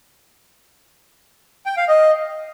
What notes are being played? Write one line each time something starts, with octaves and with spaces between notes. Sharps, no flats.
G5
F5
D#5